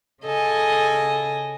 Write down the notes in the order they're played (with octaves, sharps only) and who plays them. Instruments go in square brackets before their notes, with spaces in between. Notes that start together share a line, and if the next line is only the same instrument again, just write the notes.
[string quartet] C#3 A4 D#5 G#5